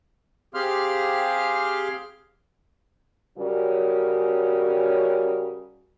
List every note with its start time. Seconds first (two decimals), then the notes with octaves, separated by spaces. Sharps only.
0.54 C4 G4 G#4 F5 C6 F6
3.38 C#3 G3 C#4 F#4 A#4